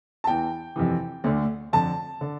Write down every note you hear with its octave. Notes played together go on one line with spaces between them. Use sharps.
A5
E2 E3 G5
F2 C3 E3
D2 D3
F2 D3 A5
D3